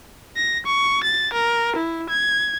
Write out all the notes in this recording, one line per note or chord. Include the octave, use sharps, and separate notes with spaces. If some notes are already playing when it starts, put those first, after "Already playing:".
A#6
C#6
A6
A#4
E4
G#6